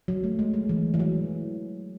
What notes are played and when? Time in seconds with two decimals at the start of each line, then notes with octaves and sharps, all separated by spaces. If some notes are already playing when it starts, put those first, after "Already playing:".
0.08 F#3
0.24 A3
0.39 G#3
0.54 G#3
0.69 E3
0.94 E3
0.99 F#3